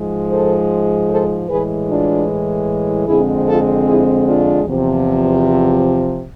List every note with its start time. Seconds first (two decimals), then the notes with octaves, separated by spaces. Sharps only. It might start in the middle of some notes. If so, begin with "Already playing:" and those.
Already playing: G#2 F3 G#3
0.29 A4 C5
1.09 A4 C5
1.48 A2 E3 G#3 G#4 B4
1.87 D4 F4
3.06 F2 D3 G#3 C4 E4 G#4
3.46 F4 A4
3.86 E4 G#4
4.25 D4 F4
4.65 E2 C3 F3